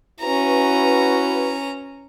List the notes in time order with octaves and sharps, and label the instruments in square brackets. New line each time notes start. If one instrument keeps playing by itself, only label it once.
[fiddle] C#4 A#5 [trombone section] E4 F#4 B4